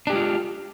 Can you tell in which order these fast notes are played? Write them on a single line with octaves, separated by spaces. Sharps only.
D4 G4 G#3 F4